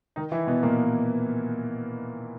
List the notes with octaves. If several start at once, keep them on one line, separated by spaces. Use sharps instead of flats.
D#3 D#4
E3 E4
B2 B3
A#2 A#3